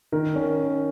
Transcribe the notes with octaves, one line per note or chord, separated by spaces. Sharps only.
D#3 A#4
C#4